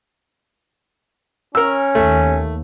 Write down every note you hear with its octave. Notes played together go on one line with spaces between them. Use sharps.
C#4 A#4 E6
D#2 A3